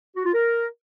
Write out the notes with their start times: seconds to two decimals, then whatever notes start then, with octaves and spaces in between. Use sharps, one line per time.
0.16 F#4
0.25 F4
0.34 A#4